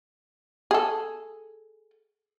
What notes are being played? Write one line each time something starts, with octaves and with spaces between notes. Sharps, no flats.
G#4 A4